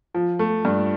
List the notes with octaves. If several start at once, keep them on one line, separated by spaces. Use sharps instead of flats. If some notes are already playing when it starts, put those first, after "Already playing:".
F3
A3
G2